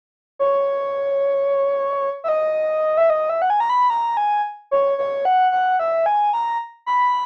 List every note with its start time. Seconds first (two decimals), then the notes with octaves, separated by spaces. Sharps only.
0.39 C#5
2.24 E5
2.28 D#5
2.97 E5
3.10 D#5
3.30 E5
3.42 F#5
3.50 G#5
3.60 A#5
3.70 B5
3.90 A#5
4.17 G#5
4.71 C#5
4.98 C#5
5.25 F#5
5.52 F#5
5.79 E5
6.06 G#5
6.33 A#5
6.86 B5